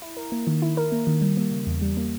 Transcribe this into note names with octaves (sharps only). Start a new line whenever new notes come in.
E4
A#4
A#3
D#3
E4
A#4
A#3
D#3
G3
A#3
C#3
E2
G3
A#3